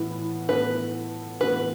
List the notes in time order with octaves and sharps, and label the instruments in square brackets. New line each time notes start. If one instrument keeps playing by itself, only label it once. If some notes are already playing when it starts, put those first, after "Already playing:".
Already playing: [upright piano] A2 E3 B3
[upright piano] A2 E3 B3 F#4 A4 [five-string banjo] B4
[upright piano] A2 E3 B3 F#4 A4 [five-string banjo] B4